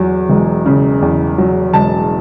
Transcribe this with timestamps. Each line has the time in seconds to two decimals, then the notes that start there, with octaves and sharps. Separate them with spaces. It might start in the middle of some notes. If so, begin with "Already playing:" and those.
Already playing: E2 F#3
0.29 E1
0.66 C#3
1.02 E2
1.38 F#3
1.74 E1 A5